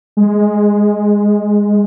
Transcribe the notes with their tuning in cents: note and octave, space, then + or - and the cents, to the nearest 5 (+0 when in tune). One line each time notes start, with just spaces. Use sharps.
G#3 +0